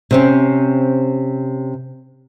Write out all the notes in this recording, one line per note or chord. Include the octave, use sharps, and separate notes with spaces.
C3 C4 C#4